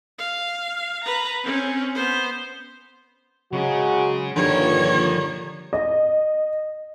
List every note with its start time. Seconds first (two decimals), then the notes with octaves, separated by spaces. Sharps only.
0.19 F5
1.04 B4 A#5
1.44 C4 C#4
1.95 B3 C5
3.53 C#3 F#3 G#3 C#4 F#4
4.36 G2 A#2 D3 D#3 F3 G3 A#4 C#5
5.73 D#5